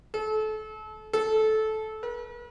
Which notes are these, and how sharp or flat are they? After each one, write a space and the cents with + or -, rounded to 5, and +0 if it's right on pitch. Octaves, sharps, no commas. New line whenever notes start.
A4 -30
A4 -15
B4 -40